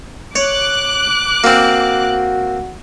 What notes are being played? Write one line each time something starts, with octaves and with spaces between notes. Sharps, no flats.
C#5 D6 F#6
A#3 C4 F#4